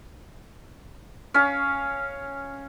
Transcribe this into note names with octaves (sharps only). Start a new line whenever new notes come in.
C#4 F5